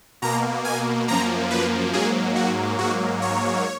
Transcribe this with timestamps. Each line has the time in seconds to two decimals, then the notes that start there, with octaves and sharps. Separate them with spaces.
0.22 B2 A#3 A#5
0.65 G#5
1.08 F#2 F3 A#3 A#5
1.50 B4
1.93 G#2 F#3 A#3 G#4
2.36 F#4
2.79 G#2 F#3 A#3 F#4
3.22 C#5